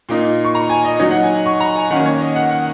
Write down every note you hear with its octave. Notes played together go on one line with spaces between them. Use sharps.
A#2 A#3 D#4
C#6
A#5
G#5
D#5
F#3 D#4 C#5
F#5
G#5
C#6
A#5
G#5
D#3 A#3 C#4 F#5
C#5
D#5
F#5
F#5